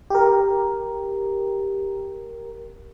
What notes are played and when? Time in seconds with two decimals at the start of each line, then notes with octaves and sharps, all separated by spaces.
0.10 G4 A#4